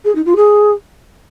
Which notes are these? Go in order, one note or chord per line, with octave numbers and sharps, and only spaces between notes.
G#4
D#4
F4
G#4